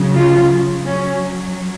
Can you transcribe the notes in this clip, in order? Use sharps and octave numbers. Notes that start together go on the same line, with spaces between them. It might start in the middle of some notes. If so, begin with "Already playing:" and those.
Already playing: C#3 F#3
F4
F#3 C#4